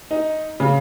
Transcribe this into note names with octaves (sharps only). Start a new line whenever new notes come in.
D#4
C#3